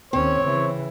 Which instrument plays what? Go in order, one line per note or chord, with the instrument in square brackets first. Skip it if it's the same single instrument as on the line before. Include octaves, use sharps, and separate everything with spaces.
[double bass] D#2 C#4 [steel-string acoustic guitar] C4 [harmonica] C#5
[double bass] C#3 E3